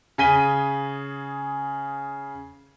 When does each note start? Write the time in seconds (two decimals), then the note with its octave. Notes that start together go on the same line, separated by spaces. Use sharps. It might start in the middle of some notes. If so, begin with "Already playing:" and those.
0.18 C#3 G#4 B6 D#7 G7